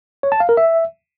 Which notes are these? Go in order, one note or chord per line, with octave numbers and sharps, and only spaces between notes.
C#5
A5
F5
A#4
E5